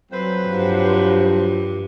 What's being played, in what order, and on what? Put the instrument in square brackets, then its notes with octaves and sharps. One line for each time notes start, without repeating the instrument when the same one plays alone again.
[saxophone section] F2 B4 C5 [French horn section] F#3
[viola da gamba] G2 [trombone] F3